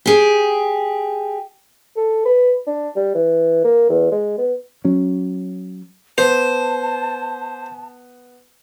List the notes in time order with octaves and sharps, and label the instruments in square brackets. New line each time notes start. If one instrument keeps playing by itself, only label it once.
[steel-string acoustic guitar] G4 G#4
[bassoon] A4
B4
D4
G3
E3
A#3
E2
G#3
B3
[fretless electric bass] F#3 C#4
[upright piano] B3 [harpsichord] C5 [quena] A5